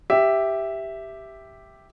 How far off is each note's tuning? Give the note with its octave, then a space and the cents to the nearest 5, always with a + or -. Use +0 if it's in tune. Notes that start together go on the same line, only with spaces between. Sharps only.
G4 +0 E5 +0